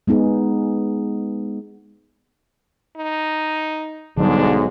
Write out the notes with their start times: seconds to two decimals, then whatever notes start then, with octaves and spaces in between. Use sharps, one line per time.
0.07 G#3 B3 D#4 G#4
2.97 D#4
4.17 B1 G#2 D3 F#3 G3 D4